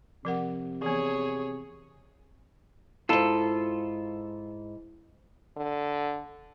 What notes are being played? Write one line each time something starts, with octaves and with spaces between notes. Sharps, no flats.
C3 F3 A#4 F#5
E3 B3 G#4 C#5
F2 G#2 E4 F4 A4 B5
D3